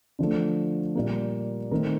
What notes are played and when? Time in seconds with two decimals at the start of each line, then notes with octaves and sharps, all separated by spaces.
0.19 D3 F3 A3
0.95 A#2 G3 A#3
1.71 D#3 A3 C4 D#4 A#4